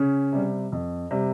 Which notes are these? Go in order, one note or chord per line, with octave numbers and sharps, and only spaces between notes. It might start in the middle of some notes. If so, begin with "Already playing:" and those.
Already playing: C#3 C#4
C3 G3
F2
C3 G3